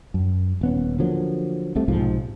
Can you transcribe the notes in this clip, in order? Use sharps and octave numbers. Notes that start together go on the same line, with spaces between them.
F#2
D#1 B3 C#4
D3 F3 F#3 A#3
C2 C3 A3
B1 G#2 C3 F3